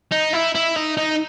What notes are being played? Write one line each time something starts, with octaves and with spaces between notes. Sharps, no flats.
D#4
E4
E4
D#4
D#4